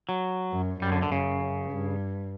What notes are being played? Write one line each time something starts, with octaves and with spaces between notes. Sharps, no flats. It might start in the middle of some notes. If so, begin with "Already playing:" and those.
F#3
F#2
F#2 G3
D3
D3
F#2 C#3
G2